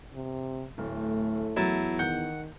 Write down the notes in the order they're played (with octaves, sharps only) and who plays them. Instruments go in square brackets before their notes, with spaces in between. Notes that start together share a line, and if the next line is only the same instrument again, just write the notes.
[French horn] C3
[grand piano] D1 [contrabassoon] A2 [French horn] A3
[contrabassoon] E2 [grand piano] F#3 [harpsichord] E4 A5
[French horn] D#3 [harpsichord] F#5 [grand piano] G6